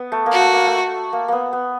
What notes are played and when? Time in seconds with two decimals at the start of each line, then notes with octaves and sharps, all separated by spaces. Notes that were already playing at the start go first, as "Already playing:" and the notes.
Already playing: B3
0.12 A3
0.26 A#3
0.32 F#4
0.39 A3
0.53 A#3
0.66 A3
1.13 A#3
1.28 A#3 B3
1.53 B3